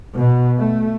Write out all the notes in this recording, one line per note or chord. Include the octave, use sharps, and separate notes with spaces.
B2
A3